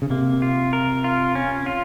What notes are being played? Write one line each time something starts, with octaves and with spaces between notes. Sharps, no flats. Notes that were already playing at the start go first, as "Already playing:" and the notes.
C#3
C3 A#3
F4
A#4
F4
C#4
F4